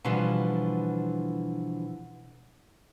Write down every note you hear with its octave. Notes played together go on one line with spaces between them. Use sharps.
B2 D3 E3 F3 G3